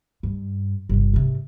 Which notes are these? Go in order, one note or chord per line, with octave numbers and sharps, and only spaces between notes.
G2
G1 C3
G#2 C3